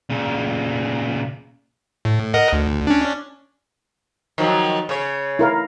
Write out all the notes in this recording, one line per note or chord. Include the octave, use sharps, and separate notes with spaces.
A#2 C#3
A2
A#4 D#5 F#5
D2
C#4 D4
D#3 F3 F#3
C#3 C#5
E4 A#4 F5